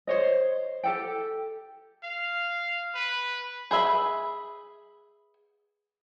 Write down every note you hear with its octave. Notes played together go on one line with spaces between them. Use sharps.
C5 C#5 D#5
G4 A4 G5
F5
B4
G#4 B4 E5 B5